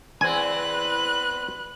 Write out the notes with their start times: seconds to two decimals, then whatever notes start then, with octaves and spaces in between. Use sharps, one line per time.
0.21 E2 C4 B4 G#5 F#6